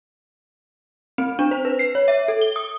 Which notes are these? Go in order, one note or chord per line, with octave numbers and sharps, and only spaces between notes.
C4
D4
C5
B4
C7
C#5
E5
A4
G7
D#6